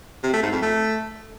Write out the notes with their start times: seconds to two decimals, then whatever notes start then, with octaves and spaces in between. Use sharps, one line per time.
0.23 C3
0.33 A3
0.43 G#2
0.52 F2
0.62 A3